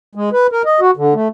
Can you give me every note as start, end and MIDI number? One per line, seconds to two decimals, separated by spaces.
0.15 0.30 56
0.33 0.47 71
0.52 0.62 70
0.65 0.80 75
0.80 0.91 66
0.97 1.14 50
1.14 1.28 57